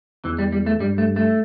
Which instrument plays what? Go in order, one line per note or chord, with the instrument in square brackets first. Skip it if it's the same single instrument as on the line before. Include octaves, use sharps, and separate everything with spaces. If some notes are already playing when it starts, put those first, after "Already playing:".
[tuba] E2 [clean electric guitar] E3
[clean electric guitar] G3
G3
A3
[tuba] G2 [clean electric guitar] G3
[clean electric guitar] A3
A3